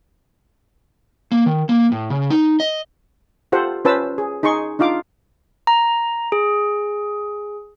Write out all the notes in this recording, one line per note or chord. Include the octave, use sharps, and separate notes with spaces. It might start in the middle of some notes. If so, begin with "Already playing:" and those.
A#3
D#3
A#3
A2
C#3
D#4
D#5
F4 G4 A4 C5 F#5
C#4 F4 B4 C5 A5 E6
G#4
D#4 G#4 C6 C#6
D4 D#4 F4 F5 D6
A#5
G#4